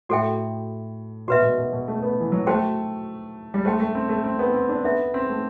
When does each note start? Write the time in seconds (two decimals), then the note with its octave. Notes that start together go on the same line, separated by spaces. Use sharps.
0.09 A2 F#4 A4 E5 G5
1.27 B2 F#4 B4 E5
1.42 B2
1.58 B2
1.73 B2
1.88 A3
2.03 B3
2.20 E3
2.32 F#3
2.46 A3 F#4 C5 G5
3.54 G3
3.65 A3 C5 G5 C6
3.80 A3
3.95 C4
4.09 A3
4.24 C4
4.39 B3
4.54 C4
4.69 D4
4.84 B3 A4 E5 A5
5.14 C4
5.29 A3